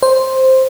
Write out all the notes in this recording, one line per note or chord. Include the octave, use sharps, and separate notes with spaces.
C5